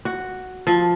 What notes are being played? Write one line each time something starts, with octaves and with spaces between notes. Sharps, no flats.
F#4
F3